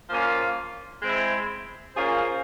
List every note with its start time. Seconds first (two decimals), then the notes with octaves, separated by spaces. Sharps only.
0.10 F3 A#3 C#4 F4
1.02 G#3 C4 E4
1.95 A#3 C#4 F4 G#4 C5